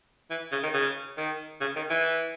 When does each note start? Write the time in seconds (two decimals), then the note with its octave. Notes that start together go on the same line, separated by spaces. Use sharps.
0.30 E3
0.52 C#3
0.63 D#3
0.74 C#3
1.17 D#3
1.61 C#3
1.76 D#3
1.90 E3